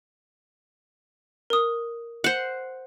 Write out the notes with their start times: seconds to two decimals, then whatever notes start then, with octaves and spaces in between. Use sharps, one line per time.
1.50 A#4 D#6
2.24 C5 F#5